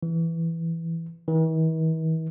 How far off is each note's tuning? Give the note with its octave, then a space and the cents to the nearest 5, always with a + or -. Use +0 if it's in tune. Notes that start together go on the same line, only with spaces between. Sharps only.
E3 +5
E3 -45